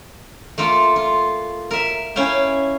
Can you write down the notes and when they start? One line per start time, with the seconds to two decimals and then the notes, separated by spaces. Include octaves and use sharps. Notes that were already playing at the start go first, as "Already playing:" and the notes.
0.58 A3 A#3 F4 A4
0.96 F4
1.71 A#4 E5
2.16 C#4 E4 F5 G5